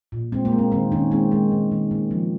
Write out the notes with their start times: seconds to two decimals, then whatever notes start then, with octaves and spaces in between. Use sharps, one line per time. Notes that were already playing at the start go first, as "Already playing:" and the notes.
0.12 A#2
0.32 G#3 C4
0.45 A#3
0.52 G#3
0.58 C4
0.72 D#3 C4
0.92 D#3 C#4
1.11 G#3 C4
1.31 G#3
1.51 D#3
1.71 D#3
1.91 C#3 A#3
2.11 F3